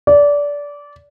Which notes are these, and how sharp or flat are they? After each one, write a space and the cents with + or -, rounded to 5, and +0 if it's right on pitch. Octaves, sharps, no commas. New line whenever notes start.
D5 -20